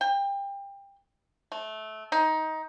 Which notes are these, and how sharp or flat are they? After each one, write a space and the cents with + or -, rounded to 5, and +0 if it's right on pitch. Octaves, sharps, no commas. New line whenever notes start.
G5 +25
A3 -20
D#4 +20